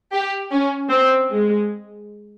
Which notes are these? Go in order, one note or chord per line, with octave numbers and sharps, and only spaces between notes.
G4
C#4
C4
G#3